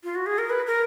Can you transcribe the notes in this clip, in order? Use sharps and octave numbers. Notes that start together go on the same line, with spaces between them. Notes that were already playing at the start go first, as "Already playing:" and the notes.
F4
F#4
G#4
A#4
B4
A#4